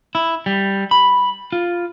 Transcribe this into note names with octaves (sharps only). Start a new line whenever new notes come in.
E4
G3
B5
F4